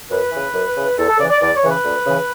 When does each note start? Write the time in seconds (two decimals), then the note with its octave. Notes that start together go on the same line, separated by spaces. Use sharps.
0.10 F#2 B4
0.32 C#3 E3
0.54 F#2
0.76 C#3 E3
0.97 E2 A4
1.08 A4
1.19 C#3 E3 D5
1.30 D5
1.41 E2 D5
1.55 C#5
1.62 C#3 E3
1.70 B4
1.84 D2
2.06 C#3 E3